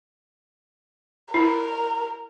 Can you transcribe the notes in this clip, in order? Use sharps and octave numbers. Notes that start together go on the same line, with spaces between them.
E4 A#4